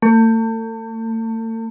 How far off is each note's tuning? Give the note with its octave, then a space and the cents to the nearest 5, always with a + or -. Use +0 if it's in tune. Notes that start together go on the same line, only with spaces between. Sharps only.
A3 +40